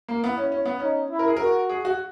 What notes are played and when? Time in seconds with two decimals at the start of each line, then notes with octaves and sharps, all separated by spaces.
0.08 A#3
0.23 B3 E4
0.38 C#4
0.52 C#4
0.65 B3
0.80 C#4 D#4
1.10 E4
1.19 A#4
1.28 G#4
1.37 F#4 A#4
1.69 G#4
1.85 F#4